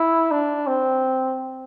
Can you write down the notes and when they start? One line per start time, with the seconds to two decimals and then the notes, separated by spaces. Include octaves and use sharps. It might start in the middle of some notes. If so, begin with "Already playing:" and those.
Already playing: E4
0.31 D4
0.67 C4